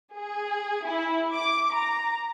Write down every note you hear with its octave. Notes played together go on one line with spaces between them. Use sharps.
G#4
E4
D6
A#5